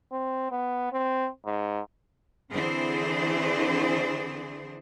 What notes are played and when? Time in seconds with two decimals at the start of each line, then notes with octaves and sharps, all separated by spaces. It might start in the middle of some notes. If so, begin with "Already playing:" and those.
0.12 C4
0.52 B3
0.92 C4
1.46 G#2
2.51 D3 E3 C4 D4 G#4 C5